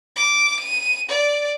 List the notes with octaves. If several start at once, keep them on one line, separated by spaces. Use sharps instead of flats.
D6
D#7
D5